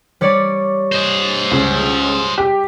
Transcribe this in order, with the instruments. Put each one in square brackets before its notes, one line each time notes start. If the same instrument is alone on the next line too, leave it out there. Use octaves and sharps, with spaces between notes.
[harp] G3 C#5 D5
[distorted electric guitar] C5 D#5
[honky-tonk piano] C#2
G4